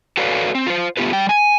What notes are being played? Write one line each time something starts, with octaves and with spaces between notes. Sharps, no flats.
F#4 A4 B4 C#5 D5 F5
C4
F4 C5
A3 B3 C4 F4 G4 B4
G3 G5
G#5